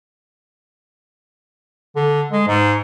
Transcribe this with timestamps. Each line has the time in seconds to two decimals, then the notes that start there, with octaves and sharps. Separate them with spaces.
1.96 D3
2.31 G#3
2.48 G#2